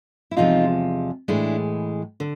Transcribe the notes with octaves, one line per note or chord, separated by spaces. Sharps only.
E4
E2 C3 F3 G#3 D#4 F4
A2 E3 G#3 D4 E4
D3